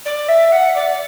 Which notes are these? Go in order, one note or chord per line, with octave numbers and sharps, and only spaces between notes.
D5
E5
F#5
D5